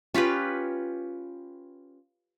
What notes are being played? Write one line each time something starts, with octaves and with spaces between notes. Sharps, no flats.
C#4 F4 G4 B4